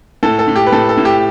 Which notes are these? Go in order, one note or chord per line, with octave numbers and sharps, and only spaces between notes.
A2 A4
A4
A2
G4
B4
A2 A4
A4
A2
G4